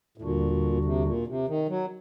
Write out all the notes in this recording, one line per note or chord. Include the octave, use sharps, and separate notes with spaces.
A2
D#2 A#2 D3 G3 D4 F#4
C3
A#2
C3
D#3
F#3